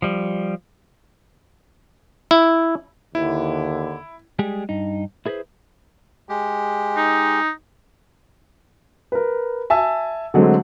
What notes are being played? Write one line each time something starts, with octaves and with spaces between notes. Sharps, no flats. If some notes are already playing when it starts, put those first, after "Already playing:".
F3 G3
E4
D#2 D3 E4
G3 G#3 G4 G#4
G2 D#4
E4 G#4 A4 B4 C5
G#3 G4
D#4
A#4 B4
E5 G#5 A5 E6
D3 F#3 G#3 A3 C4